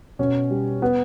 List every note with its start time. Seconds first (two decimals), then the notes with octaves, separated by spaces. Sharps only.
0.19 B2 C#4
0.50 G3
0.82 B3